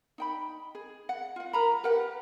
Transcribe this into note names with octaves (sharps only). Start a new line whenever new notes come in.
D#4 G5 B5
G#4
F#5
F4 F#5
A#4 A#5 B5
G4 A#4 B4 F#5